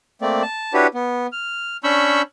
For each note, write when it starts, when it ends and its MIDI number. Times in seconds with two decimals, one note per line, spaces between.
0.22 0.42 57
0.22 0.42 58
0.22 0.42 60
0.22 0.42 74
0.43 0.73 81
0.73 0.87 62
0.73 0.87 64
0.73 0.87 66
0.73 0.87 67
0.73 0.87 71
0.73 0.87 73
0.94 1.27 59
1.32 1.77 89
1.84 2.22 61
1.84 2.22 62
1.84 2.22 83
1.84 2.22 85
1.84 2.22 88
1.84 2.22 91